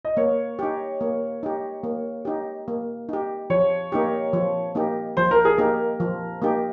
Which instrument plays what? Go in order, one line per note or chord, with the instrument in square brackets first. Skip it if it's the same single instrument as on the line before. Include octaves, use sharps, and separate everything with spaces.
[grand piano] D#5
[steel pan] A#3 [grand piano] C#5
[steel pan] D#4 G4
A#3
D#4 G4
A#3
D#4 G4
A#3
D#4 G4
[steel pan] F3 [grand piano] C#5
[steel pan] A#3 D#4 G4
F3
A#3 D#4 G4
[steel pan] F3 [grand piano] C5
[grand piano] A#4
G#4
[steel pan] A#3 D#4 G4 [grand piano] A#4
[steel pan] F3
A#3 D#4 G4